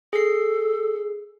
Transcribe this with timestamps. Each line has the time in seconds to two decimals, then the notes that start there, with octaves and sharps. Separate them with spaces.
0.13 G#4 A4 C7